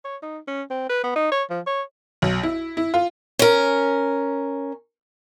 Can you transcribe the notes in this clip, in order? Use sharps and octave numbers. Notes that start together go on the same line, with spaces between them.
C#5
D#4
C#4
C4
B4
B3
D#4
C#5
F3
C#5
B1
E4
E4
F4
C#4 A#4